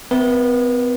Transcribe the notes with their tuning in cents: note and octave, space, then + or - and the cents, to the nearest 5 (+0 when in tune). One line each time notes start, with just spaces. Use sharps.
B3 +45 B4 -40 E5 +0